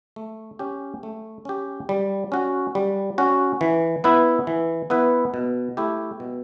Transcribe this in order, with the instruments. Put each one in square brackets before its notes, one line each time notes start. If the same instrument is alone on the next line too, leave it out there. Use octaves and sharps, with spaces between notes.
[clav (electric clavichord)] A3
C#4 G4
A3
C#4 G4
G3
C#4 F#4
G3
C#4 F#4
E3
B3 E4 B4
E3
B3 E4 B4
B2
A3 E4 G4
B2